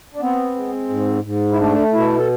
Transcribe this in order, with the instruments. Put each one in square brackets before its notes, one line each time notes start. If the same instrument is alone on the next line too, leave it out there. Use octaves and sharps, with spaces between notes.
[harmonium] D4
B3 C4
G#3
G#2
G#2
E4
A3 D4
B2 E4
A4